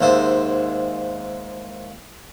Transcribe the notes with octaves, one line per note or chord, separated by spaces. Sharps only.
D#2 G#2 C5 E5